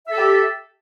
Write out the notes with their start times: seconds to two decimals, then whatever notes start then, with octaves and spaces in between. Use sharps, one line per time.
0.07 E5
0.12 A4
0.16 G4